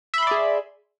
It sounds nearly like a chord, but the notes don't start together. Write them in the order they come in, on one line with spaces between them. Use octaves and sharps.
E5 B5 C6 D5 G#4